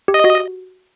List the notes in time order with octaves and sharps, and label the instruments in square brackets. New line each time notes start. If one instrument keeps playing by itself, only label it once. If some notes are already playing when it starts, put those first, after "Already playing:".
[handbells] G4
[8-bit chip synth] D#5
[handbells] F#4